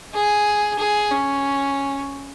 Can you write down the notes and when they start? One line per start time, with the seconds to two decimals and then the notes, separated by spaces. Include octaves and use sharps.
0.14 G#4
0.79 G#4
1.11 C#4